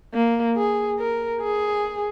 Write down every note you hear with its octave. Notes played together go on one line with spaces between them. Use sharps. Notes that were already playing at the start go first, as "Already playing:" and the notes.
A#3
G#4
A#4
G#4